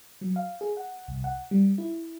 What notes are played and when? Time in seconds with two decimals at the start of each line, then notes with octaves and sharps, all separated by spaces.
0.21 F#3
0.36 F5
0.61 G#4
0.77 F#5
1.08 C2
1.24 F#5
1.51 G3
1.78 E4